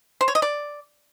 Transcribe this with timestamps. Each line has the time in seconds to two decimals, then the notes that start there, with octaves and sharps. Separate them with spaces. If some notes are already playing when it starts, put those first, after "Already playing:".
0.21 C5
0.28 C#5
0.35 D#5
0.42 D5